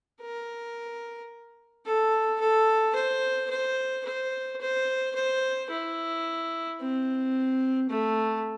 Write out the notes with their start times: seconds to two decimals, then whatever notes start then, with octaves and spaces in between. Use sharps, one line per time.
0.21 A#4
1.85 A4
2.40 A4
2.95 C5
3.50 C5
4.05 C5
4.60 C5
5.15 C5
5.70 E4
6.80 C4
7.89 A3